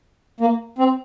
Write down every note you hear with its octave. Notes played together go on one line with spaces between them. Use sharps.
A#3
C4